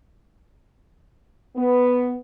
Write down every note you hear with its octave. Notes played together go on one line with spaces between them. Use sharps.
B3